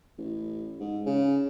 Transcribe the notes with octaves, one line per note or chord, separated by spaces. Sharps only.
A1
G#2
C#3